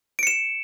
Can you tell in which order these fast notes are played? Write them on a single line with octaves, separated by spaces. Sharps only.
D7 C#7 E7